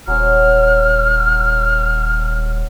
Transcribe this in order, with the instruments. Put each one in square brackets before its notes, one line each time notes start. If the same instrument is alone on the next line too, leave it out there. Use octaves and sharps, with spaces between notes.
[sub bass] D#1 [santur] F#3 C#4 C5 [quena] F6